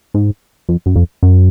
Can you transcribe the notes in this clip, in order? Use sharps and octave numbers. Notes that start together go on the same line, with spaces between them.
G#2
F2
F#2
F2
F#2